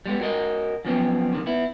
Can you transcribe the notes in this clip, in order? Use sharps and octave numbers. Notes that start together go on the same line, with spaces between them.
G3 G#3 B3
F#4 A#4 D#5
F#2 F3 B3 C4
C3 D#3
B3 E4